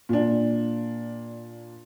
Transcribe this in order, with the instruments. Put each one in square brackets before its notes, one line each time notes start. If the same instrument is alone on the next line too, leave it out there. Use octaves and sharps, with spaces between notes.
[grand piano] A#2 D4